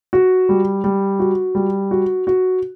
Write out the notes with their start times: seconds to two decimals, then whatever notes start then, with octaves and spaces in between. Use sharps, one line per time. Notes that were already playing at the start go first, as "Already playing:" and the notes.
0.13 F#4
0.49 G3
0.84 G3
1.19 F#4
1.55 G3
1.91 F#4
2.27 F#4